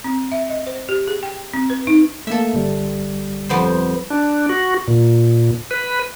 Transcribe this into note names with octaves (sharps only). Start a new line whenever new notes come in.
C4
E5
D#5
C5
G4
G#4
G5
C4
B4
D#4
A3 A#3 A4 E5
G1 G3
F2 B3 C5
D4
F#4
A#2
B4